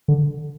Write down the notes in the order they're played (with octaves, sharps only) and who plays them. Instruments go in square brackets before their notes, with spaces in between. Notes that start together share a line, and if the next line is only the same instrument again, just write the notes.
[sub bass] D3